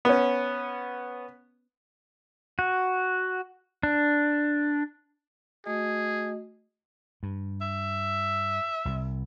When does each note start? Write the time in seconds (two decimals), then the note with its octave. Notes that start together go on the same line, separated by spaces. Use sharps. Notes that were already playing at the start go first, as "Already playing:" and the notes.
0.05 B3 C#4
2.59 F#4
3.83 D4
5.66 A3 F#4 G#4 D#5
7.23 G2
7.61 E5
8.85 C2 C3